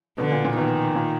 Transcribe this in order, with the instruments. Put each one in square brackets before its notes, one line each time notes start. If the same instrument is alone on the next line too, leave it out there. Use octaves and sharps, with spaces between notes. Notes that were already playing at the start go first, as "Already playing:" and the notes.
[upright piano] B2 [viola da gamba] D3
[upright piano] A#2
A#2
[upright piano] B2 [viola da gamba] D#3
[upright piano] A#2